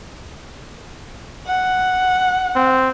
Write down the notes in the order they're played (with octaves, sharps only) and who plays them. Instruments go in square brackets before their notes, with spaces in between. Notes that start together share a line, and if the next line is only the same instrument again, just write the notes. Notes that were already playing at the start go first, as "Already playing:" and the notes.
[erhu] F#5
[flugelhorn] C4